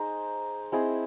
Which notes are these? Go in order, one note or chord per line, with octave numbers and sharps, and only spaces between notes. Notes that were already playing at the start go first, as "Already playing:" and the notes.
Already playing: D#4 G#4 C5 D#5
C4 E4 G#4 D#5